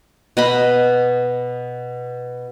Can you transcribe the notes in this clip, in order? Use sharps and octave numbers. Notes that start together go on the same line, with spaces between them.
B2 D#5 B5